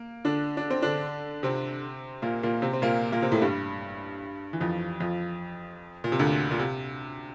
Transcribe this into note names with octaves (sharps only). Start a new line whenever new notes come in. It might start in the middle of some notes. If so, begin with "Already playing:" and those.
Already playing: A#3
D3 D4
D4
C4
D3 D4
C3 C4
A#2 A#3
A#2 A#3
C3 C4
C4
A#2 A#3
A#2 A#3
C3 C4
A2 A3
G2 G3
E3
F2 F3
F2 F3
A#2
C3
D2 D3
A#2
C3